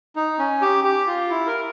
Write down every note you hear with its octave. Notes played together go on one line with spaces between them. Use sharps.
D#4
C#4
G4
G4
F4
E4
A#4